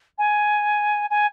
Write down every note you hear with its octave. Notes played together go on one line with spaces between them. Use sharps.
G#5
G#5